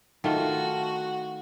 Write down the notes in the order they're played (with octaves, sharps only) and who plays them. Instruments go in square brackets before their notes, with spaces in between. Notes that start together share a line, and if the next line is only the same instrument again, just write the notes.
[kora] D#3 A3 F4 [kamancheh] F#4